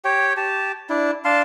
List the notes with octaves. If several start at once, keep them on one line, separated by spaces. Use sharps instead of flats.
G4 C#5 G5
G4 A5
D4 E4
D4 F5 A5 C6